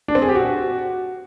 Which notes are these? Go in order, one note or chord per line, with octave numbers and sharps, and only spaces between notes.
D4
C4
G#4
G4
F#4